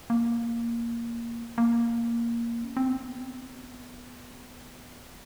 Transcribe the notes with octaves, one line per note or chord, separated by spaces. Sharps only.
A#3
A#3
C#4
C4
B3